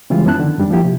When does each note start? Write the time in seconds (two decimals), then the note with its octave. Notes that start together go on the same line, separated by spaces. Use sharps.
0.10 C#3 E3 G3 G#3 F4
0.26 F#2 B3 C#4 E4 A5 F#6
0.40 D3 D#3
0.58 F#2 G3 D4
0.71 F3 A#3 E4 G4
0.84 C3